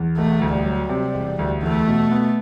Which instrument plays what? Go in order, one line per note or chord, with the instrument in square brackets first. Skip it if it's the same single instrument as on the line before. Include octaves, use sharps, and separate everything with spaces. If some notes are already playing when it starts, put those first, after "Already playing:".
Already playing: [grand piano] E2
[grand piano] E1 [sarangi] A3
[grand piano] D2
[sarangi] G3
[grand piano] F#3
C3
E1
D2
[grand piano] E2 [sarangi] A3
[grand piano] B2
B3